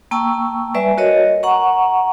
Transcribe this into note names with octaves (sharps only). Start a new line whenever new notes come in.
A#3 G5 A5 C#6 E6
G3 B4 D5 E5 G#5
F#4 A#4 C#5 D#5
F#5 A#5 C#6